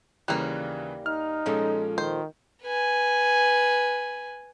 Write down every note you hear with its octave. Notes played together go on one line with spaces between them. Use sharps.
D#2 C#3 E3 G3 A#3 F#6
D#4 F6
A#2 F3 G#3 C#4 A4
D#3 C5
B4 G#5